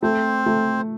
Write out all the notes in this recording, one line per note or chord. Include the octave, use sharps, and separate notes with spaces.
A3 C4 C5
A3